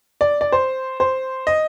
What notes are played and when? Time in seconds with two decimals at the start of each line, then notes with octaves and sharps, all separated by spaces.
0.21 D5
0.41 D5
0.52 C5
1.00 C5
1.47 D#5